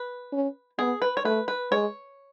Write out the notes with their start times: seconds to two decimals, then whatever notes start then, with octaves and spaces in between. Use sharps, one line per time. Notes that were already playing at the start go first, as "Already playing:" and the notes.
Already playing: B4
0.33 C#4
0.78 B3 G#4
1.02 B4
1.17 C#5
1.25 A3 B4
1.48 B4
1.72 G#3 C#5